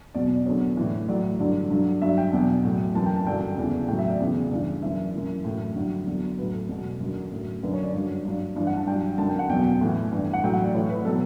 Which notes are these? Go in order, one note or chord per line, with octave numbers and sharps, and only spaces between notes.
E2 B2 F#3 D5
D5
E2 D3 F#3 C#5
A2 E3
A2 F#3 D5
G2 D3 F#3
G2 D3 F#3
G2 F#3 E5
G5
E2 B2 F#3
A2 F#3
F#2 E3 A5
G5
A5
G2 D3 F#3 G5
E2 C#3 E3
A2 F#3 G5
E5
D5
E2 C#3 E3
G2 E3
F#2 E3 E5
F#2 E3
A2 F#3
G2 D3 F#3
E2 D3 F#3
A2 F#3 B4
A4
E2 B2 F#3
F#2 D3 F#3
A2 F#3
F#2 D3 F#3 B4
C#5
D5
G2 F#3
G2 F#3
G2 E3 D5
F#5
A5
G2 F#3 G5
F#2 D3 F#3 A5
G5
F#5
E2 B2 F#3 G5
A2 E3
G2 E3
F#5
A2 F#3 G5
F#5
D5
A2 E3 C#5
B4
B2 F#3 A4